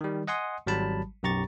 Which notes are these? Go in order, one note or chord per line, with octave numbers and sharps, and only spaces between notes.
D#3 G3
D#5 F#5 G#5 C6 D#6
G#1 F#3 G3 A5 B5
B1 F#2 G4 A#5 C#6 A6